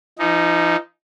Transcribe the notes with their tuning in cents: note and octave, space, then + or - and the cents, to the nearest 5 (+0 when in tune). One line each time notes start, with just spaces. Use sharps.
F3 -40 D#4 +0